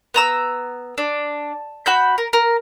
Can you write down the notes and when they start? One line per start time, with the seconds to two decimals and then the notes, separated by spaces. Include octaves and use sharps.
0.14 B3 A#5 E6
0.98 D4
1.86 F#4 B5 G6
2.18 A#4
2.33 A#4